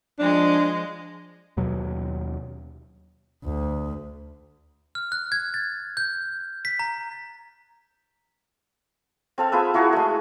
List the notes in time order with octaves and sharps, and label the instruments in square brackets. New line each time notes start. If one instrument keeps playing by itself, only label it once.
[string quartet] F3 G#3 [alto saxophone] D4
[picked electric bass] D#2 B2 F#3
[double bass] D2
[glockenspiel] F6
F#6
G#6
A6
G6
B6
A#5
[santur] C4 A4 F5
F4 G#4 B4 E5
E4 F#4 G#4 A#4
G#3 A3